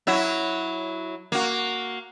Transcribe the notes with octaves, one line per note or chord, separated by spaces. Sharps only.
F#3 E4 F#4
A#3 F#4